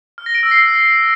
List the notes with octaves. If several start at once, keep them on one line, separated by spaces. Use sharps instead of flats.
F6
A#6
D7
E6
C7